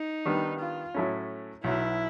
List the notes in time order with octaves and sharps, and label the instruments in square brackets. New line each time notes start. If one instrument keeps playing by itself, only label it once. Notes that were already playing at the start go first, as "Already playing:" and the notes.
Already playing: [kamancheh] D#4
[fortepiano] D#3 G3 B3 D4
[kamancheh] F4
[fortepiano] A2 F#3 A3 C#4
[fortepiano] B1 B2 F#3 [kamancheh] E4